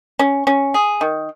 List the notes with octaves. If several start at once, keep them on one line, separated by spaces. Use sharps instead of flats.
C#4
C#4
G#4
D#3